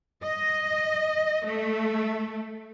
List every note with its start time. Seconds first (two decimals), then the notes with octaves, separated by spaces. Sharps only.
0.22 D#5
1.46 A3